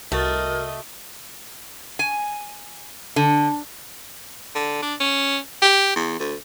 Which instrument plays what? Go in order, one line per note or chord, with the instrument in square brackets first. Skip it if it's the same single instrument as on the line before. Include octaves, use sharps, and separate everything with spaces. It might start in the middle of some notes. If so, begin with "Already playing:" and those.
[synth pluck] C2 F#4 A6 [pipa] A3 [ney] A#4 [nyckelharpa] D#5
[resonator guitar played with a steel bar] G#5
D3
[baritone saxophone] D3
D4
C#4
G4
E2
D2